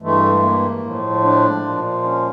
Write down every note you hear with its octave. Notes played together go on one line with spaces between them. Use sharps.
G2 E3 G#3 A3
A#3
A2 F3 G#3
D4
A#2 F3 G#3
C#4